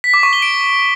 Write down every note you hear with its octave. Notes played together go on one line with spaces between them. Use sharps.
B6
D6
C#6
G7
D7